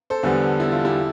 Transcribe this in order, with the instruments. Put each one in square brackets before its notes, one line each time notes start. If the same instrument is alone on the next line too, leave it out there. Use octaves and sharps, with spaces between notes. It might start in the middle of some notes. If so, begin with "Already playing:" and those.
[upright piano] A4 C5
E2 D3 G3 B3
E4
F4
E4 G4